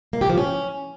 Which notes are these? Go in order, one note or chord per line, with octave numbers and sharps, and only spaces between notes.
A#3
G4
F3
C#4